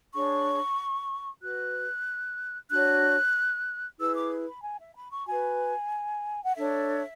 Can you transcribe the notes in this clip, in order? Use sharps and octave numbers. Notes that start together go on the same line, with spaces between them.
D4 G#4 C#5 C#6
F#4 B4 F#6
D4 F#4 C#5 F#6
E4 G#4 B4 E6
D6
B5
G#5
E5
B5
C#6
F#4 B4 G#5
F#5
D4 A4 C#5 E5